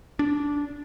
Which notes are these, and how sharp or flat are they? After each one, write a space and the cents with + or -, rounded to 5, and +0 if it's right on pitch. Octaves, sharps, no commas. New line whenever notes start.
D4 -15